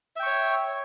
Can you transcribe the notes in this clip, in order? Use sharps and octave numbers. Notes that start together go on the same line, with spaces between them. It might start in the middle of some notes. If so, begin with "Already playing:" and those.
C#5 E5 G5 C#6